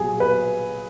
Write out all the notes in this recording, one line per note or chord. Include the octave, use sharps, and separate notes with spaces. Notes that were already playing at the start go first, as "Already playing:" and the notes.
Already playing: B1 A#2 F#3 G#4
B4